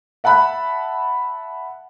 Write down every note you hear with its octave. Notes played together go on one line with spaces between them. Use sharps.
E5 F#5 A5 B5 F#6